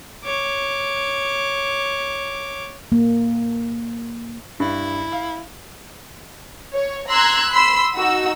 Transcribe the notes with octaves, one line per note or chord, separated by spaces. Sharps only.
C#5 D6
A#3
G2 E4
F5
C#5
A#5 C6 E6 F#6 G#6
B5 C6 E6
D#4 F#4 E6